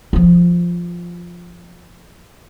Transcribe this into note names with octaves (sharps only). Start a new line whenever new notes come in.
F3 F4